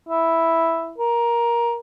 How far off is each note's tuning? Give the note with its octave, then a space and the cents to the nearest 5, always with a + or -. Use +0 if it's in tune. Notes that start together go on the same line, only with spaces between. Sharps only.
E4 +0
A#4 +15